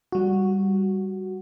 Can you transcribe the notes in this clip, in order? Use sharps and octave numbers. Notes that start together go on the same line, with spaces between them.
G3 F#4